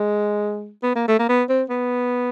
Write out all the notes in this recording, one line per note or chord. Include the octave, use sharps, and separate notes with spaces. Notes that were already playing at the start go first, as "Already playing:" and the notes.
Already playing: G#3
B3
A#3
A3
A#3
B3
C4
B3